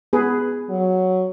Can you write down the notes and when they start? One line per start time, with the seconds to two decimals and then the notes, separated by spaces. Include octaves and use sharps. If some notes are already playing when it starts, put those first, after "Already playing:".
0.13 B3 G#4 B4
0.70 F#3